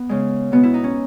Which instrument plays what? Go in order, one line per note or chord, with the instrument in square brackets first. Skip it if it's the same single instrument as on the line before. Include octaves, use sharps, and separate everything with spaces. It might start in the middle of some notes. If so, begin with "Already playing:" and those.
Already playing: [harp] B3
C#3 G#3
B2 G#3 B3
E4
D#4
C#4